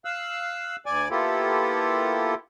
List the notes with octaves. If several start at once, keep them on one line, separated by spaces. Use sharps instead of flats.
F5 E6 F#6
D2 D5 G#5 D6
A#3 B3 E4 F4 G4 A4